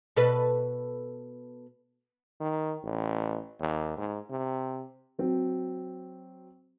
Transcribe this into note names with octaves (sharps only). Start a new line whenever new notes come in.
B2 A4 B4
D#3
A1
D#2
G#2
C3
F#3 C4